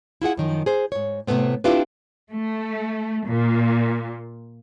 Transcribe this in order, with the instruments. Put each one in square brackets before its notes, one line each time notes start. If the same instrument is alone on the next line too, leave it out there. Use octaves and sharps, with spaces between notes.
[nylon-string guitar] E4 F4 G#4 F#5
F#2 D#3 F3
G#4 C5
G#2 C#5
A2 C3 D#3 A3 B3 C4
C4 D4 E4 F4 G4 B4
[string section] A3
A#2